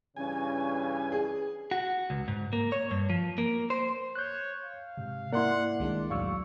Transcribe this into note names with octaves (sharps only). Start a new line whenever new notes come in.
G2 C#3 E3 C#4 G#5
G#4
F#4
C#2
G#2
A#3
C#5
G2
F3
A#3
C5
C#5 F#6 G6
F5
G#2 C3
A#3 E4 D5 F#5 C6
C2 D#3 G#3 D4 D5
E2 A2 F#3 F5 C#6 E6